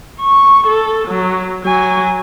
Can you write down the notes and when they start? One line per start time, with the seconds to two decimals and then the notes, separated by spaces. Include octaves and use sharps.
0.20 C#6
0.67 A4
1.08 F#3
1.64 F#3 G#5